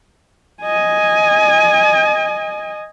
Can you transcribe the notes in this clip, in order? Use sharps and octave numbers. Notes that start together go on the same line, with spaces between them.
D#5 G#5